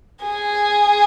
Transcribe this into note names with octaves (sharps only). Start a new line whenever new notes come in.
G#4